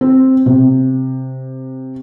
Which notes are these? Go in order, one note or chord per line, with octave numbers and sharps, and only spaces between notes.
C4
C3